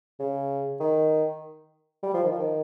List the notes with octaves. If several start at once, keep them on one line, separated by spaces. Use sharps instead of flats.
C#3
D#3
G3
F3
D#3
F3
D#3